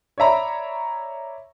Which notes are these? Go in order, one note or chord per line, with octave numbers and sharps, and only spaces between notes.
C#5 D5 E5 A#5 B5